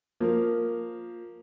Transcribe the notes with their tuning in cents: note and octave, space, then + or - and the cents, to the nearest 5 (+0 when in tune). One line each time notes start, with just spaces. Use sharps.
F3 +10 A#3 +0